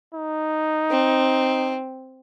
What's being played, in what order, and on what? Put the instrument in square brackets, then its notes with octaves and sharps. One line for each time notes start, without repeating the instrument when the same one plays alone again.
[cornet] D#4
[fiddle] C4